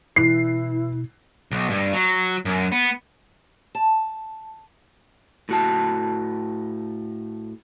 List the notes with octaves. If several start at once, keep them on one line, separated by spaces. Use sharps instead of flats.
B2 E3 E4 C7
B1
G2
F#3
F#2
B3
A5
A2 F#4 A5